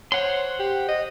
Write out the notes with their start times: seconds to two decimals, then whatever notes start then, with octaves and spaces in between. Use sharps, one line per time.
0.12 C5 C#5 F#5 C6
0.60 G4
0.88 D#5